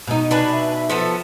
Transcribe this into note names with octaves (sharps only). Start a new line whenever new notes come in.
B2 D#4
D4 B4 G#5
E5
F3 B3 A4